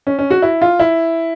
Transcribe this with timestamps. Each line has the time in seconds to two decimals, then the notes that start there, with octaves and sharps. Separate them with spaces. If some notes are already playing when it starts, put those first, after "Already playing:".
0.07 C#4
0.19 C#4
0.30 F#4
0.42 E4
0.62 F4
0.80 E4